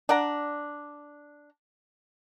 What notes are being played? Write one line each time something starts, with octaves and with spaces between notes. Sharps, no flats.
D4 D5 F#5 A#5